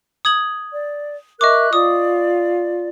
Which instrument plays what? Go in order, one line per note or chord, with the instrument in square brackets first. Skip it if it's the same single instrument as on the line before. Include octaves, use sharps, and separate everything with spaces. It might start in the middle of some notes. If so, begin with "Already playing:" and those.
[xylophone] D#6 G#6 F#7
[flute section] D5
[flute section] A#4 E5 F#6 [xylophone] D#5 C#6 D6
[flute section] F4 D5 [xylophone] D#6